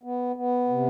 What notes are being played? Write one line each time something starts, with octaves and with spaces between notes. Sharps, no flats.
B3
B3
C3